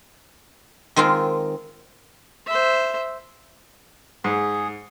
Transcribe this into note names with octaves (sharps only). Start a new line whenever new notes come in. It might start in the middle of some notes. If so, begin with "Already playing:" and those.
D#3 G#3 C4 F4
C5 E5
G#2 G#4